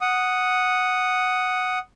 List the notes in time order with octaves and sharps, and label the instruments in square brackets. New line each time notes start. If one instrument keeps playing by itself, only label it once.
[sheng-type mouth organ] F#5 D#6